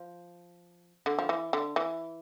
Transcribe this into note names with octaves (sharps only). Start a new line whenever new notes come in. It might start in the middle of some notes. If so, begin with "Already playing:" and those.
Already playing: F3
D3
F3
E3
D3
E3